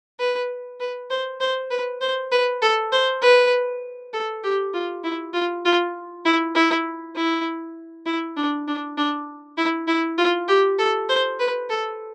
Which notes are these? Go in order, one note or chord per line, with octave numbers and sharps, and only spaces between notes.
B4
B4
C5
C5
B4
C5
B4
A4
C5
B4
A4
G4
F4
E4
F4
F4
E4
E4
E4
E4
D4
D4
D4
E4
E4
F4
G4
A4
C5
B4
A4